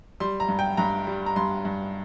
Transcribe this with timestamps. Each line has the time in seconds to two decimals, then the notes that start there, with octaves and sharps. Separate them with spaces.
0.20 G3 C6
0.40 A#5
0.48 G2
0.59 G5
0.77 G2 A#5
1.07 G3
1.26 A#5
1.36 G2 C6
1.65 G2